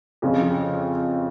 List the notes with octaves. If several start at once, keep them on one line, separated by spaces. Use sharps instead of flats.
F2 C#3 F3